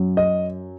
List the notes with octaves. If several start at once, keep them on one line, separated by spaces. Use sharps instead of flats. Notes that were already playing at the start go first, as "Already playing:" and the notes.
Already playing: F#2 F#3 C#4
D#5